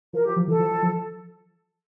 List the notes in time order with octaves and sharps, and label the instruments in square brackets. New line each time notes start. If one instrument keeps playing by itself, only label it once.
[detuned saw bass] F3 [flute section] A#4
[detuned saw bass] F3 [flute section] G4
[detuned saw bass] F3
[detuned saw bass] E3 [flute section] A4
[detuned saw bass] F3
F3
F3